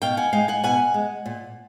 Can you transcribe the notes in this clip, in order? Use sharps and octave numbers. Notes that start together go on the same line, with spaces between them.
B2 F5 G5
F#5 G#5
G#3 F5 G5
F#5 G#5
B2 F#5 G#5
G#3
A#2